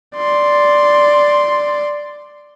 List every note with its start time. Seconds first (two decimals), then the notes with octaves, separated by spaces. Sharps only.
0.16 D5 C6